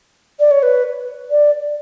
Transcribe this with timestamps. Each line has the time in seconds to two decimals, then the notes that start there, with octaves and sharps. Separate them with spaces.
0.39 D5
0.51 C#5
0.63 B4
1.30 D5